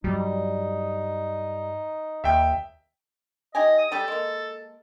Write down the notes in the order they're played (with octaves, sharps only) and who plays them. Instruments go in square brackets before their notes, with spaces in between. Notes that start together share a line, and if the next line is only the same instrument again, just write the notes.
[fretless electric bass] G2 F#3 [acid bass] G3 [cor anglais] D#4
[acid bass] D#2 [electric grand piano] E5 G5
[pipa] D#4 G4 G#5 [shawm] D#5
[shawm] D#6
[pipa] G3 G4 [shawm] A4
[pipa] G#3 A#3